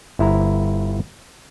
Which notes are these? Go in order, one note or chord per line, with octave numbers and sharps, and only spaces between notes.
G1 E4 C5 A#5